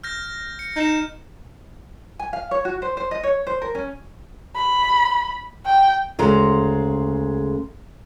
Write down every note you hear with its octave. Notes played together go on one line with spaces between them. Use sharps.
F6 G6 A#6
C#7
D#4 G6 E7
G#5
F5
C#5
F#4
C5
C5
D#5
C#5
C5
A#4
C#4
B5
G5
D2 C#3 G#3 A#5